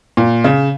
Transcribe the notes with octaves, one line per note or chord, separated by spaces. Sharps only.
A#2
C#3